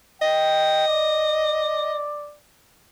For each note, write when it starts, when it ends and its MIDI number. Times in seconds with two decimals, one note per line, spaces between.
0.22 2.02 75
0.22 0.85 79
0.87 2.37 74